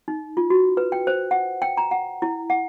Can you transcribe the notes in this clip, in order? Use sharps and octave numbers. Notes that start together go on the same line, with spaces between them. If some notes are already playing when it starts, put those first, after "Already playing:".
D#4
F4
F#4
B4
G5
C5
F#5
G5
A#5
F#5
E4
F#5